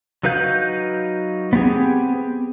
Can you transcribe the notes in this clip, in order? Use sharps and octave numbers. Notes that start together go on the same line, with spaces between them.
F#3 D#4 B4 F5 G6
B3 C4 G4 G#4